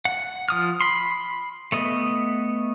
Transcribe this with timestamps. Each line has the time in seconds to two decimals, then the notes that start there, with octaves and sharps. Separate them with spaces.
0.05 F#5
0.49 F3 D#6 F6
0.81 B5 C6
1.72 A3 B3 D#5